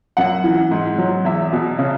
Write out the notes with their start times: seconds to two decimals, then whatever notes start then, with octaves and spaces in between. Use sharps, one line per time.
0.17 F#2 F#5
0.44 E3
0.71 G#2
0.98 F#3
1.25 E2 E5
1.53 B2
1.79 C#3